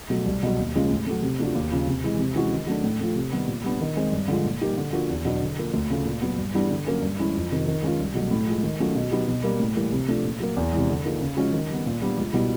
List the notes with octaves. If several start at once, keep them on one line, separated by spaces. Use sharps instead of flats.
B2 F#3 A3
C2
B2 F#3
D#2
C#3 F3 G#3 C#4
A2
F#3 A3
C3
F3 A3 D4 F#4
D#2
C#3 F3
C3
E3 G#3
C3
E3 G#3 C#4 F#4
D#3
F#3 A3 D4
A2
F3 A3
C3
D#3 G3 B3
A#2
G3 B3 D4
D#3
G#3 C4
G2
D3 F3 G#3
A#2
G3 A#3 D#4 G4
D3
F3 A#3 D4 F#4
E2
B2 F#3 B3 D4
D3
F3 A#3
D2
C#3 F3 A3
A#2
F#3 B3
G2
E3 G3 B3 D4
D3
F#3 A#3 C#4
G2
E3 G#3 C#4 E4
F2
C3 D#3
D#3
G#3 C#4 F4
C2
B2 F#3 A3
A2
F3 G#3
D#3
F#3 A3 C#4 F4
B2
F#3 B3 D#4 G4
B2
G3 A#3
A2
E3 G3 A#3
C3
F3 A3 D4
A#2
F#3 A#3
E2
C3 E3 G#3
D3
F3 A#3 D#4 G#4
C#3
F3 G#3 C#4 F#4
D#3
G3 B3
A#2
G3 B3 D4
C#2
B2 G3 B3 E4